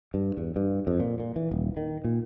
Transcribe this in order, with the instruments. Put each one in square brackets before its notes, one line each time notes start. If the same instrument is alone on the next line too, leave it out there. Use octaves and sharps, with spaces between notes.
[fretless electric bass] G2
E2
G2
F2
A#2
A#2
E3
D#1
D#3
A#2